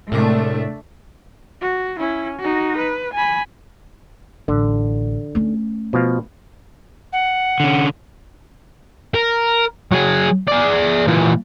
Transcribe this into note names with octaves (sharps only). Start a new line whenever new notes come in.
C2 A2 G#3 A3 D4 D6
F#4
C#4 E4
D#4 F#4
B4
G#5 B5
A1 D3
A3 C#4
B2 F3 F5
F#5
D3 C#4
A#4
F#3 G#4
G#4 D5
A#2 E3